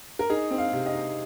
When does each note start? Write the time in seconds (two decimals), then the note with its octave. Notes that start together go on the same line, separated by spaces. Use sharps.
0.19 A#4
0.30 D#4 G#4
0.51 C4
0.58 F5
0.72 C3
0.86 D#5
0.93 D#4